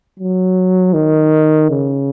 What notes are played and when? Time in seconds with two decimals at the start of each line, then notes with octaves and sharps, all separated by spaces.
0.19 F#3
0.93 D#3
1.70 C#3